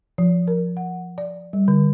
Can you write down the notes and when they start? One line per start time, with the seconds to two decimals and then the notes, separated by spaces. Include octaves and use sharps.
0.18 F3
0.47 A#4
0.77 F#5
1.18 D5
1.53 G3
1.68 D3